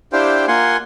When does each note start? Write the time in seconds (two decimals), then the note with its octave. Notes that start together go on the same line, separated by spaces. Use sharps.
0.13 D4 E4 G4 C5 F5 G5
0.48 A#3 F4 F#5 G#5 C6